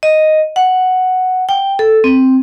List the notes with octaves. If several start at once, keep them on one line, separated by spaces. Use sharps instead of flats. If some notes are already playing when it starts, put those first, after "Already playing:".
D#5
F#5
G5
A4
C4